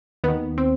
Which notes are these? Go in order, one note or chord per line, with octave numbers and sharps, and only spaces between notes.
D#2 D#3 B3
C4